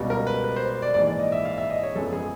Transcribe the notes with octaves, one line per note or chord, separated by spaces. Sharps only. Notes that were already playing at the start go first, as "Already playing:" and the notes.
Already playing: C#2 B2 G3
A#4
B4
B4
C5
C5
D5
A#1 G#2 E3 D5
D5
D#5
E5
F5
E5
D#5
C#5
F#2 C#3 F3 G#3 B3 A4
G#4